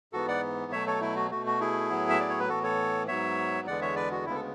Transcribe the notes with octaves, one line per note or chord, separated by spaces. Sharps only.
G#2 E3 B3 F#4 A4
D5 F#5
B2 F#3 A3 C#5 E5
A4 C#5
E4
F#4
B2 A3 F#4
F#4
E4 G#4
A2 F#3 B3
E5
D5
C#5
B4
A2 E3 B3 F#4 A4
A4 C#5
G#2 F#3 B3 C#5 E5
E2 D3 G#3 B3 D5 F#5
C#5 E5
B4 D5
F#4
D2 C#3 G#3 B3 E4
A4